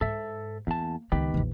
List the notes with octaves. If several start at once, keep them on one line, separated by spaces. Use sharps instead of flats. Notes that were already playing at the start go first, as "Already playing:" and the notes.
G#2 A4 E5
E2 A#3 A5
C#2 D#3 B3 G4 B4
A#1 E2